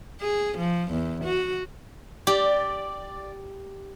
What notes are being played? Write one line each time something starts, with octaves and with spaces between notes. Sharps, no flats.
G#4
F3
E2
F#4
G4 D5